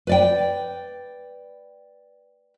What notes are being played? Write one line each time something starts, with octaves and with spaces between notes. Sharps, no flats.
B4 D5 G5